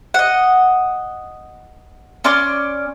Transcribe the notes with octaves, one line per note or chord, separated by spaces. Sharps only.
D#5 F#5
C#4 D5 C6 F6